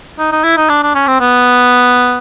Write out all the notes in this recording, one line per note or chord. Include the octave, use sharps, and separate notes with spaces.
D#4
D#4
E4
D#4
D4
D4
C#4
C4
B3